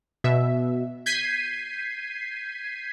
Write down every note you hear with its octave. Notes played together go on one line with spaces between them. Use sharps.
B2 E5
G6 G#6 B6 C7 D#7